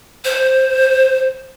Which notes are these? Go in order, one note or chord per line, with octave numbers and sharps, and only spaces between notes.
C5